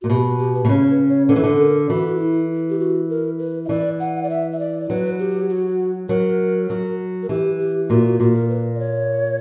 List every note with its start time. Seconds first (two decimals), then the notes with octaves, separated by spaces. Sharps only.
0.02 A#2 F#4
0.09 B2 G4
0.40 G4
0.55 B4
0.65 B2
0.69 C#3 C#5
0.90 B4
1.09 C#5
1.29 D3 B4
1.36 E3
1.44 D3
1.59 A#4
1.89 E3 F#4
2.08 F#4
2.19 E4
2.70 G4
2.79 F#4
3.09 A#4
3.39 B4
3.65 E5
3.69 E3 D5
4.00 F#5
4.16 F#5
4.23 D5
4.30 E5
4.52 E5
4.59 D5
4.90 F#3 B4
5.20 G4
5.50 F#4
6.09 F#3 A#4
6.70 F#3
7.23 A#4
7.29 E3 G4
7.59 G4
7.90 A#2 F#4
8.05 F#4
8.19 A#2 F#4
8.35 A#4
8.49 B4
8.75 D5
8.80 C#5